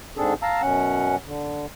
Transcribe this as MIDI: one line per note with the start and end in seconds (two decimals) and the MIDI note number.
0.17 0.34 44
0.17 0.34 60
0.17 0.34 62
0.17 0.34 68
0.17 0.34 69
0.43 0.62 77
0.43 0.62 81
0.43 0.62 82
0.43 0.62 88
0.62 1.16 42
0.62 1.16 47
0.62 1.16 61
0.62 1.16 78
1.26 1.66 50